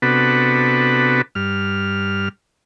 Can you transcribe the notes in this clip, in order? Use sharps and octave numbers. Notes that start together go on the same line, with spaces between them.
C3 B3 D4 F#4 A4 B4
G2 F6